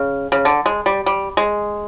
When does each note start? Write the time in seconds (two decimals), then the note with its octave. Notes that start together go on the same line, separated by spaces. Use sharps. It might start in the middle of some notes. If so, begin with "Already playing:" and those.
Already playing: C#3
0.32 C#3
0.45 D3
0.66 G#3
0.86 G3
1.06 G3
1.37 G#3